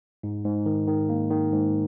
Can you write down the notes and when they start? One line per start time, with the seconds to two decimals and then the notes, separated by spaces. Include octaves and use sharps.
0.23 G#2
0.45 G#2
0.66 D#3
0.88 D#3
1.09 A#3
1.30 D#3
1.52 G#2